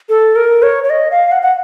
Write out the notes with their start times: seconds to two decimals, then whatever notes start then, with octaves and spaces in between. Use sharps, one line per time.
0.09 A4
0.36 A#4
0.63 C#5
0.84 C#5
0.90 D#5
1.11 F5
1.32 F#5
1.42 F#5